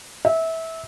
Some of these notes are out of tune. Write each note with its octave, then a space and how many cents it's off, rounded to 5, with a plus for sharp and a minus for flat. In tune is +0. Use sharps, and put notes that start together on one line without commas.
E5 -20